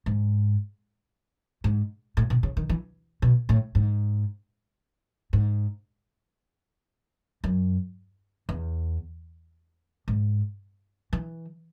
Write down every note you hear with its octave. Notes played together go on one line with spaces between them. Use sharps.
G#2
G#2
A2
B2
C#3
D#3
E3
B2
A2
G#2
G#2
F#2
E2
G#2
E3